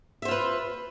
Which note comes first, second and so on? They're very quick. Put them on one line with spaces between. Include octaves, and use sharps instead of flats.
E5 C5 F4 B4